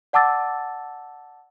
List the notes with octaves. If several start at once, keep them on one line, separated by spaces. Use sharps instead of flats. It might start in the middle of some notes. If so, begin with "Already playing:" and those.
D5 F#5 A5 D6 E6 A6